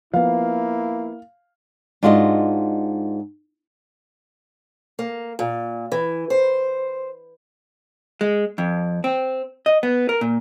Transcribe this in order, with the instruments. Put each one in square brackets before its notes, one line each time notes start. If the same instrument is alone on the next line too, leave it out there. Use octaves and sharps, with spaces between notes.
[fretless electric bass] F3 B3 [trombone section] A#3 E4 [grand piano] F5
[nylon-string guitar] G#2 D4 F4 F#4 A#4 D#5
[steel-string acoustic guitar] A#3
A#2
E3
C5
[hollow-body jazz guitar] G#3
F2
C4
D#5
B3
A#4
A#2